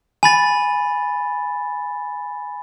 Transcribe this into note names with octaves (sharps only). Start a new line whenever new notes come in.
G#5 B5 A6